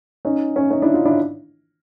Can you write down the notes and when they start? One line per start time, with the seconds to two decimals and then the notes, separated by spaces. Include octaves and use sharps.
0.25 C#4 D#4
0.56 C#4
0.71 C#4 D#4
0.82 D4 E4
0.94 D#4 F4
1.05 D4 E4